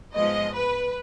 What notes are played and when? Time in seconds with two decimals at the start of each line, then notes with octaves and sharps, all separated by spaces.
0.15 G#2 F3 G#3 B3 D#5
0.54 B4